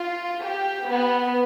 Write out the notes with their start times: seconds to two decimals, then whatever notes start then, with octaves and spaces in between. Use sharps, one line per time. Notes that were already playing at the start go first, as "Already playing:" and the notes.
Already playing: F4
0.42 G4
0.89 B3